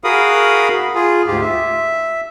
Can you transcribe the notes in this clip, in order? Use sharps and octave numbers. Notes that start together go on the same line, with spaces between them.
F#4 G#4 A#4 F5 B5 D#6
F4 G#4
D2 G#2 F4 G4
E5